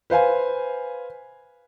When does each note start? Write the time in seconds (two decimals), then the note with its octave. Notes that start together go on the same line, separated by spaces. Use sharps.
0.10 B4 C5 F5 G#5